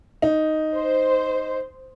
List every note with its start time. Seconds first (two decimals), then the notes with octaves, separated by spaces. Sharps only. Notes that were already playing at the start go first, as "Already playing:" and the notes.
0.22 D#4
0.75 C5